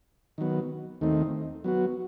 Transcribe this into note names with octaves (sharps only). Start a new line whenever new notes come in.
D#3 F#3 B3
D#2 D#3 A3 C4 D#4
F#3 B3 F#4